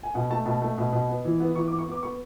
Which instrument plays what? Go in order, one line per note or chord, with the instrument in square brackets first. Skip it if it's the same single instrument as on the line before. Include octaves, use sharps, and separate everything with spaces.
[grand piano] G#5
B2 F#5
A3 A5
B2 A5
A3
B2
B2
B3
E3
B3
E3 C#6
D6
B3
C#6
B3 D6
B3 C#6